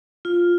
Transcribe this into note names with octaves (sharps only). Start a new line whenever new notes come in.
F4